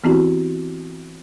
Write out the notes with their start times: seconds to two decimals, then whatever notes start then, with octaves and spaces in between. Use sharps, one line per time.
0.04 E3 B3 C4 E4 F#4 G4